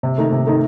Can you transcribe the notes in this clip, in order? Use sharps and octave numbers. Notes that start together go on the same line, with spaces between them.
C3
D#3 A3 D#4
C3
D#3 A3 D#4